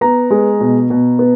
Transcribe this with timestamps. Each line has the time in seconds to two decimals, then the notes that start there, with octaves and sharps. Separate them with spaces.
0.01 B3 A#5
0.30 G#3
0.61 B2
0.90 B2
1.19 B3